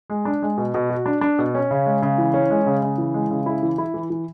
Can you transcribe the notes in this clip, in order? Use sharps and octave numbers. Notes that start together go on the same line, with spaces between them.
G#3
D4
G#3
B2
B2
F#4
D4
D4
B2
C#4
C#3
G#3
C#3
E3
C#4
G#3
C#3
C#3
E3
G#3
C#3
E4
E3
E4
E3
E3